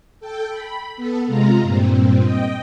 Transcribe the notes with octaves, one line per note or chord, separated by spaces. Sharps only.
A4 G5
B5
B3 A4
C3 G#3 F4 A#5
G2 A#2 C4
D#5 G5